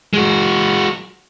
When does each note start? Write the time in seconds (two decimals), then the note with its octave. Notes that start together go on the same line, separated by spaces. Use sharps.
0.13 G#3 F#4